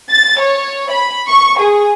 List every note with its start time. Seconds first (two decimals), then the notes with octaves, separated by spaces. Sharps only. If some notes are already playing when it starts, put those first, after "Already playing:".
0.11 A6
0.40 C#5
0.91 B5
1.28 C#6
1.60 G#4